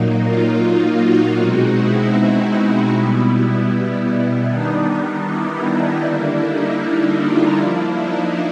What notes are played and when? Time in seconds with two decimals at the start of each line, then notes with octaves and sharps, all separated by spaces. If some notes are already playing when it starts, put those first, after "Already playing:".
Already playing: A#2 F#3 A#3 D#4
0.22 F4
0.99 F#4
1.37 B2 G#3 C4 D#4 F#4
1.76 E4
2.16 D#4
2.92 B2 G3 B3 E4
4.47 D#3 G3 B3 D4 D#4
4.87 D#4
5.25 E4
6.01 D3 G3 A#3 D4 E4
6.41 D#4
7.19 F4
7.57 F3 A#3 D4 E4
7.96 D#4